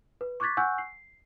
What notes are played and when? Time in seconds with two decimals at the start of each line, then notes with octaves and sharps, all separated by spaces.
0.21 B4
0.40 C#6 D6 F#6 G#6 A6 B6
0.57 F#5 G#5 C#6 E6 F#6 G6
0.78 C7